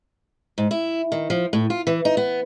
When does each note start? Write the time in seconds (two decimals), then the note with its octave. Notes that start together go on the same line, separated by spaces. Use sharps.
0.58 G#2
0.71 E4
1.12 D#3
1.30 F3
1.53 A2
1.70 F4
1.87 E3
2.05 D#4
2.17 B3